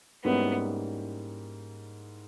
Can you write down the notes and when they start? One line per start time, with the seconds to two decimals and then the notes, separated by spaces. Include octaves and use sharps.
0.24 G#2 G3 A#3 B3 C#4 E4